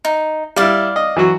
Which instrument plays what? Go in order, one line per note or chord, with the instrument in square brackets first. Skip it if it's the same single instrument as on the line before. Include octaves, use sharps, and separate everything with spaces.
[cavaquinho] D#4
[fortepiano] G3 E4 [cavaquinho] D5 F5
[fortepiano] D#5
E3 F#3 F#4